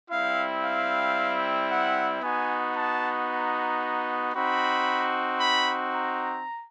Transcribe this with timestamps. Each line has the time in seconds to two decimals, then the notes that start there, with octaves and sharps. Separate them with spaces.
0.10 G3 C4 E4 F5
0.63 F5
1.69 F#5
2.22 B3 D#4 F#4 G#5
2.75 A5
3.28 A#5
4.33 C4 D#4 F#4 B5
5.39 B5
5.92 A#5